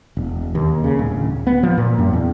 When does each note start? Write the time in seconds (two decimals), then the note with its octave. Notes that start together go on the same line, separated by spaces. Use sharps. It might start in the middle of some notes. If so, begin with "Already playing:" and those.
0.17 E1
0.55 D#2
0.84 C#3
0.99 D1
1.47 B3
1.63 F3
1.78 A#2
1.99 F#2
2.13 E2